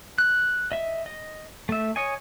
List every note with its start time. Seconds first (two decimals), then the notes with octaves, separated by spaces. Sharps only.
0.18 F#6
0.72 D#5 E5
1.06 D#5
1.69 A3 E5
1.96 C#5 D#5 G#5